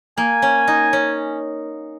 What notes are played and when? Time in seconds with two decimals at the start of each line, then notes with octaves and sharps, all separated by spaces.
0.18 A#3 G#5
0.42 C#4
0.68 D#4
0.93 C#4